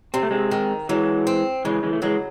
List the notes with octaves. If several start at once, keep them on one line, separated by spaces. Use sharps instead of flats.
C3 C4
A3
G#3 C4
D#3
E3 F#3 G#3
C4
C#3 E3 G#3
E3 G#3
A3
E3 F#3 G#3